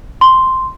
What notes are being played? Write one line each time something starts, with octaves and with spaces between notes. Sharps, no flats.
C6